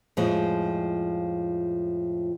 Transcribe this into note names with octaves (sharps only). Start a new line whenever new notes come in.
F2 A2 F3 G#3